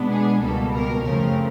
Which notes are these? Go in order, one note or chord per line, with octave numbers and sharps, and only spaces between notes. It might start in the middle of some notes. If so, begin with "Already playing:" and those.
Already playing: B2 G#3 B3 D4
G#4
C#2 B2 G3 A#3 A4
A#4
F#2 C#3 F3 A3 C4 A#4